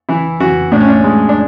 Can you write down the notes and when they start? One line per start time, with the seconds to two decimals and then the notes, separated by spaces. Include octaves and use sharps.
0.09 E3 E4
0.40 E3 F#4
0.72 A2 D4
0.80 C#4
0.88 D4
1.04 G#3
1.29 D4